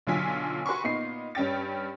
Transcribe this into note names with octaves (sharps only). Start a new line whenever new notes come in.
B1 D3 F#3 F4 G#5 B6
F#4 B4 G#5 C6 C#6
A#2 B3 D#4 C7
G2 C#4 G5 A6